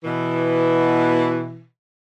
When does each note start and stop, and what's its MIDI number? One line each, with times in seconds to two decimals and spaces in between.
0.04 1.65 47
0.04 1.65 52